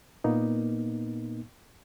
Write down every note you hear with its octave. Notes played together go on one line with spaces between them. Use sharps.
A#2 A#3 B3 D#4